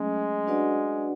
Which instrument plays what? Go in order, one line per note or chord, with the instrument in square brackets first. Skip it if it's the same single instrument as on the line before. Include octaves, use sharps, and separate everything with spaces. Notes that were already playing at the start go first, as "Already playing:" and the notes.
Already playing: [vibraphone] F#3 A3 C#4 [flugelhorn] G#3
[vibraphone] D4 F#4 B4 D5 F#5